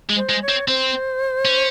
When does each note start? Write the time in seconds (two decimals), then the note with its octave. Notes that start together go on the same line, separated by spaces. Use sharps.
0.10 G#3
0.16 C5
0.30 G#3
0.42 C#5
0.49 C4
0.68 C4 C5
1.45 C#4